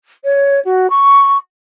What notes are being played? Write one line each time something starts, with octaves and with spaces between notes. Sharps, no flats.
C#5
F#4
C#6